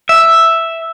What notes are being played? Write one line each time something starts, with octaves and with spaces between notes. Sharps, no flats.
E5